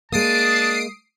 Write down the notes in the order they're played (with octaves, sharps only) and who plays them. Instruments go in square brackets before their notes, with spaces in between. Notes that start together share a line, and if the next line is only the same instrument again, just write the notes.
[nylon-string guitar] G#3 A#3 [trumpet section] D4 A5 [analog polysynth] D#6 C7 D7